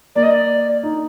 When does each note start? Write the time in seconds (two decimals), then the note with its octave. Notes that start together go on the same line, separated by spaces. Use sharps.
0.16 A#3 D5
0.23 D#5
0.30 D5
0.83 D#4